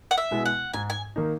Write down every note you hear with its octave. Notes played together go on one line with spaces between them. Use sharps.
F#5
E5
B2 G#3 B3 E4
F#5
G#2 G#5
G#5
D#3 A#3 D#4